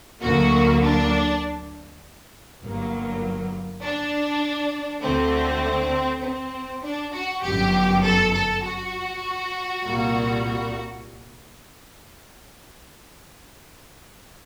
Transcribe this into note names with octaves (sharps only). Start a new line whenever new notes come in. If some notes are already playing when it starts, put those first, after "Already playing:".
D2 D3 F#3 A#3 F#4
D4
G1 G2 F#3 A#3
D4
D2 D3 A3 C4
C4
D4
F#4
G1 F#2 F#3 G4
A4
A4
F#4
C2 A#2 G3 A#3